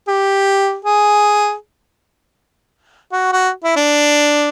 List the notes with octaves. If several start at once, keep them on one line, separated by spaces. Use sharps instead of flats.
G4
G#4
F#4
F#4
E4
D4